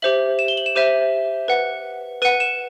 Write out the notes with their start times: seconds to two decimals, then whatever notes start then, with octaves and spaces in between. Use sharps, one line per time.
0.02 G4 C5 E5 F#7
0.39 E7
0.48 G7
0.57 F#7
0.66 E7
0.75 G4 C5 E5 D#7
1.48 B4 F#5
2.22 B4 F#5 D#7
2.40 E7